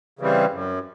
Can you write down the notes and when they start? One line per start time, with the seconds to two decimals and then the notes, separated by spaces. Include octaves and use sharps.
0.19 C#3 E3 G3 C4
0.52 F#2